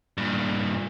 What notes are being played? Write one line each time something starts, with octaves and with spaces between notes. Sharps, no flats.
G2 A#2